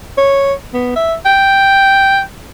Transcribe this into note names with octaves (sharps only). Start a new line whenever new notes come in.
C#5
B3
E5
G5